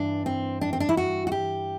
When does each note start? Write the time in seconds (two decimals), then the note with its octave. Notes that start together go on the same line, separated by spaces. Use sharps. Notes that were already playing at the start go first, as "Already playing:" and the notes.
Already playing: G2 E3 D4
0.26 C4
0.61 D4
0.73 C4
0.80 D4
0.89 E4
0.97 F#4
1.27 F#4
1.32 G4